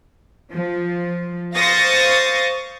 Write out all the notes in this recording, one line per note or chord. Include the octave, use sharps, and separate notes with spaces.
F3
C5 F5 C#6 D#6 A6 A#6